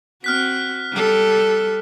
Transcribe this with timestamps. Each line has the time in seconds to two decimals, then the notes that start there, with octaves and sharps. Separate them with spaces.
0.24 C4 F#4 F6 F#6 B6
0.92 G3 A4